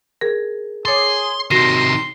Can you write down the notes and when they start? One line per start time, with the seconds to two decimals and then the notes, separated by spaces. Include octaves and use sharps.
0.21 G#4 A#4
0.85 G#4 C#5 C6 D6 A6
1.51 C3 D#3 F#4 C6 A#6 C7